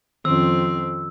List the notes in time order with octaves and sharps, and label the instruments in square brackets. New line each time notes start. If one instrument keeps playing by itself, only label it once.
[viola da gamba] F2 C4 [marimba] D#3 C#4 [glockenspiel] E6